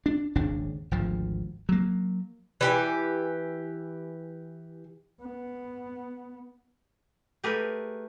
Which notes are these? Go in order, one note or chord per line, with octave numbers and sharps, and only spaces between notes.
D4
D#1 G#1 C#3 D4
G#1 D2 F3
F#3 A#3
E3 G4 G#5
B3
A3 G4 G#4 A#4 B4